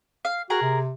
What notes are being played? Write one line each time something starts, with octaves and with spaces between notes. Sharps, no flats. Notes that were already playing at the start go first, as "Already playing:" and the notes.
F5
F#4 G#4 A#4 A#5
C3